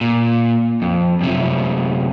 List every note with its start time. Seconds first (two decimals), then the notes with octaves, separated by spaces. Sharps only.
0.01 A#2
0.82 F2
1.21 F#2 C3